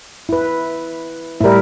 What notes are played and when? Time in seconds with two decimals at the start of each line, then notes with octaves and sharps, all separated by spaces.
0.29 E4 B4
1.41 A2 G3 E4 A#4